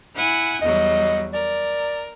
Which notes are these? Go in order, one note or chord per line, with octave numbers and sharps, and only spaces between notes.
E4 F#5 G#5
E2 F#3 G3 D#5
A#4 D5